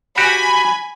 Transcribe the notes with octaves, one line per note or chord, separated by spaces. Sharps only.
F#4 G4 G#5 B5